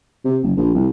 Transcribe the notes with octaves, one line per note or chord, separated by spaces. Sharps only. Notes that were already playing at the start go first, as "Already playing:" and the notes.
C3
F#1
A#1
C2